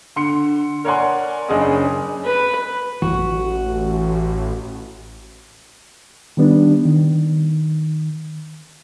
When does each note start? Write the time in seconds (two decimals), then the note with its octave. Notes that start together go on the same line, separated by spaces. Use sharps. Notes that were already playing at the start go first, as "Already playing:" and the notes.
0.16 D3 C6 C#7
0.84 A#4 C#5 D5 F#5 G#5 C6
1.49 F#1 C#4 D4 G#4 D#5 D#6
2.25 B4
3.02 A1 F#4
6.37 D#3 G3 B3 D4
6.86 D#3